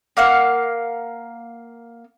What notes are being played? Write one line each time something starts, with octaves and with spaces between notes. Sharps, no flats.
A#3 F5 F#5